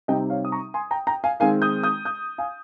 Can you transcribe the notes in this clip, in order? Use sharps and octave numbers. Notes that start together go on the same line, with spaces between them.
C3 G3 C4 D#4 D#5 G5
C#5 F5
D#6
A#5 C#6
G#5 C6
G5 A#5
G5 A#5
F5 G#5
D#3 G#3 C4 F5 G#5
D#6 G6
D#6 G6
D#6 G6
F5 G#5